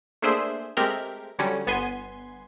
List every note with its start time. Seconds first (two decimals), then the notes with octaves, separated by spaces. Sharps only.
0.22 A3 A#3 D4 G#4 C5 E5
0.77 G#3 A3 C4 G4 A#4
1.39 D3 F#3 G3 C#4
1.67 G1 B3 G#5 C6